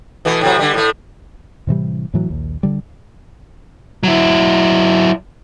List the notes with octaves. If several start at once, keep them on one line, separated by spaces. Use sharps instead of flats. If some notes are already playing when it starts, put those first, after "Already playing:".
B2 E3 A3
A2 C3 F#3
D3 G3
A2 A3
A2 C3 E3 G3
A2 E3 F#3
A#1 D#2
D3 G3
F#3 E4